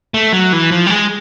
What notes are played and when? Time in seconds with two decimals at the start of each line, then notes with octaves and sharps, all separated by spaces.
0.14 A3
0.33 F#3
0.53 E3
0.71 F3
0.86 G3
0.90 G#3